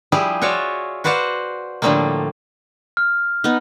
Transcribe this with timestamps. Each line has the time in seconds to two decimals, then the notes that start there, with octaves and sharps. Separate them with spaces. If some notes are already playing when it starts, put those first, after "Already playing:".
0.12 F3 G3 E4 G4 G#4
0.42 F4 F#4 C#5 D5 E5
1.04 F#4 B4 C5 D5 F5 F#5
1.82 A2 D3 F3 G3 A3 A#3
2.97 F6
3.44 B3 D#4